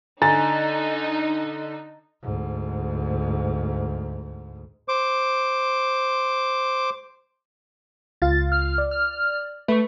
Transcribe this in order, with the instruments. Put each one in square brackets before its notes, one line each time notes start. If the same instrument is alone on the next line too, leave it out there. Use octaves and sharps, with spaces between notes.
[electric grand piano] D3 [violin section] D#4 [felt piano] G#5 A#5 A6
[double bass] D2 G#2
[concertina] C5 D6
[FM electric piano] C#2 F4 F5 [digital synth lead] A6
[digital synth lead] F6
[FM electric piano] D5
[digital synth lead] F6
[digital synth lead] A3 [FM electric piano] B4 C#6